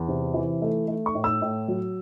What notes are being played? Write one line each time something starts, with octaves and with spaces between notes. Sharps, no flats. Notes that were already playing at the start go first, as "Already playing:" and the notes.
Already playing: E2
C3
E3
A3
A3
C#6
A2
E6
A2
F#3